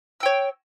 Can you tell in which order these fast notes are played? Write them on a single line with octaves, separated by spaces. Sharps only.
E6 G5 C#5